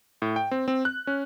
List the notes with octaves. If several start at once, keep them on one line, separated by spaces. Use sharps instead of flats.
A2
G5
C4
C4
F#6
C#4